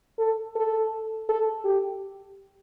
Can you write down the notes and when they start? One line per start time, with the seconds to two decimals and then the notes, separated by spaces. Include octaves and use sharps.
0.19 A4
0.55 A4
1.29 A4
1.65 G4